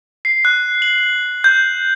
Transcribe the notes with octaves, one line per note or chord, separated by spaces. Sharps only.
C7
F#6
F#7
G6